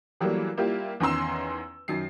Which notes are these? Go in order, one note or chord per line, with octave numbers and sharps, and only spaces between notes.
E3 F#3 G3 A3 A#3
G3 A#3 E4 F4 G4
E2 D#3 C#4 A#5 C6 E6
F#2 D#3 C7